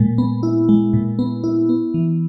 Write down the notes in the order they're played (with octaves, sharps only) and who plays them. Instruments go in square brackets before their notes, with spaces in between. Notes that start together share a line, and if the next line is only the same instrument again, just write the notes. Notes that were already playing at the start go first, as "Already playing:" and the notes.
Already playing: [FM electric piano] A#2 G#3
B3
E4
G#3
A#2
B3
E4
B3
E3